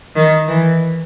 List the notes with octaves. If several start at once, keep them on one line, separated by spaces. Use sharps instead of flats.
D#3
E3